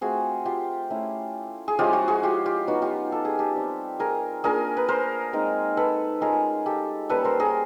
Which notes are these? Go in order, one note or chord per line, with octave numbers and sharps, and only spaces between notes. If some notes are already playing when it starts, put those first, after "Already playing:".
A3 C4 F4 F#4 G#4
F4 G4
A3 C#4 E4
G#4
F3 G#3 C#4 E4 F4 G4
F#4
F#4 G#4
F4 G4
F4 G4
F#3 B3 D#4 F#4
F4 G4
A4
G#4
G4 A4
G3 C4 F4
G#4 A#4
A#3 D4 F4 G#4 A#4
B4
A#4 C5
G#3 C4 D#4
A4 B4
G#3 C#4 F4 G#4 A#4
G4 A4
G3 A#3 C#4 A4 B4
A#4 C5
G#4 A#4